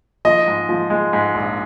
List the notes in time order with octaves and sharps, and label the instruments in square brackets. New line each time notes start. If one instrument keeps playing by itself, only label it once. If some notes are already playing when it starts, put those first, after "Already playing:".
[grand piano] F3 D#5
G#2
F3
G#3
G#2
A#1